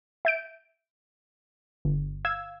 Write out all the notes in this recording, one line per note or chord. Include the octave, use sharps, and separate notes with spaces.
E5 G6 D7
G1
F5 E6 G#6